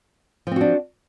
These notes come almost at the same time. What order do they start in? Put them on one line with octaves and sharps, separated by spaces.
F3 C4 F#4 D4